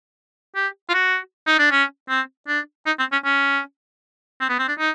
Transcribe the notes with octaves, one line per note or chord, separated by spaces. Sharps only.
G4
F4
F#4
D#4
D4
C#4
C4
D4
D#4
C4
C#4
C#4
C4
B3
C4
D4
D#4